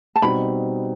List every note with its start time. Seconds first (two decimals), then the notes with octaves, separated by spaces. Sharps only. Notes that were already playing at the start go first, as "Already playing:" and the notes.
0.16 A5
0.22 B2 G3 C4 D#4 B5